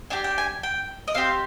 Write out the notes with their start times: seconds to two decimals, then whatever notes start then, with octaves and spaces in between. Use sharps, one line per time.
0.10 D4 G4 G#5
0.24 G5
0.38 G#5
0.63 G5
1.08 D#5
1.15 C4 G4 F5